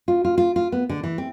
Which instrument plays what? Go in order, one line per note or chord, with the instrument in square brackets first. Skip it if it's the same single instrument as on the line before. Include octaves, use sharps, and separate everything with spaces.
[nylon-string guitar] F4
F4
F4
F4
B3
D3
E3
C4